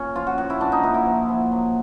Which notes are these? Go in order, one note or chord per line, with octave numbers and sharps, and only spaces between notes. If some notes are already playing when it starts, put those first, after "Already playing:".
Already playing: A#2 C#4
F3 F4
F#4
A#2 F#4
E4
A#2 D4
D#4
A#2 E4
E4
F3
F3
F#3